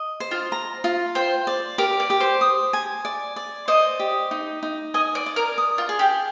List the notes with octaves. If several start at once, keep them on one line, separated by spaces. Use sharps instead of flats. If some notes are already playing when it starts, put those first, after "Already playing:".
Already playing: D#5
C5
F4
A#5
F4
C5 G5
D5
G4 A#4
D5
G4
C5
D#6
G#5
D5
D5
C5 D#5
G4
D#4
D#4
D#5 G#5
D5
D5
A#4
D#6
F4
G#4
G4